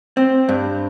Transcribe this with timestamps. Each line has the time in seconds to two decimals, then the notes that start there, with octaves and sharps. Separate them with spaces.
0.17 C4
0.49 G2